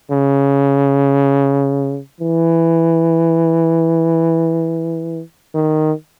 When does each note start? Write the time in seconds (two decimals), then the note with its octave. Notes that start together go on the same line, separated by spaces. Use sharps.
0.11 C#3
2.21 E3
5.54 D#3